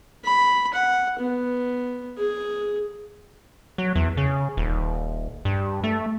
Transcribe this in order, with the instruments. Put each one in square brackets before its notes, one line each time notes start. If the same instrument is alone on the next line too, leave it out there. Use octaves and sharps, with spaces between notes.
[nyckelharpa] B5
F#5
B3
G#4
[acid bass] F#3
E2
C#3
D#1
G2
A3